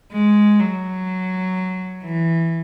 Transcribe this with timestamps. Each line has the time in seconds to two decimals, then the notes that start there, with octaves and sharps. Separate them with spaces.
0.12 G#3
0.59 F#3
2.04 E3